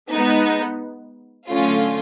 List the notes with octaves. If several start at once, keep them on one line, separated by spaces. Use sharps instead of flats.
G#3 B3 D#4
D3 F#3 A3 C#4 F4